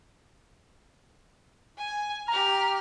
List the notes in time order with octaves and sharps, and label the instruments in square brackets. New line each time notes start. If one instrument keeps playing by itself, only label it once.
[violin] G#5
[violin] G4 F6 [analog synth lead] A#5